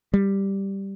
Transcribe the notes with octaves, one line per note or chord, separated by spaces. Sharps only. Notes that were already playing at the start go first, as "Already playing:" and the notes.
G3